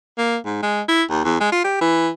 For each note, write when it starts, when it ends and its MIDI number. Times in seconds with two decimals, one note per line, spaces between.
0.18 0.37 58
0.46 0.58 44
0.63 0.82 56
0.89 1.03 64
1.11 1.24 39
1.25 1.41 40
1.41 1.50 56
1.52 1.63 65
1.64 1.80 67
1.82 2.09 52